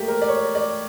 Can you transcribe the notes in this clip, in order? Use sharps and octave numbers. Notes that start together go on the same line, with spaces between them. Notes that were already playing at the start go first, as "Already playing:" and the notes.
Already playing: A3 A#3 G4
A#4
D5
C#5
D5